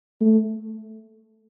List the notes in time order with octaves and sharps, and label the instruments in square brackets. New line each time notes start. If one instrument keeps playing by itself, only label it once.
[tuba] A3